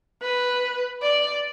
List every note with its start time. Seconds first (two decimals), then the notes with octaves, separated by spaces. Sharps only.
0.22 B4
1.02 D5